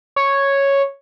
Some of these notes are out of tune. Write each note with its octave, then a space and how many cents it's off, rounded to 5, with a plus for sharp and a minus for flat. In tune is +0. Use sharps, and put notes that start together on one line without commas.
C#5 -5